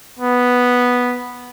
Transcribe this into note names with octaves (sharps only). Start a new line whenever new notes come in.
B3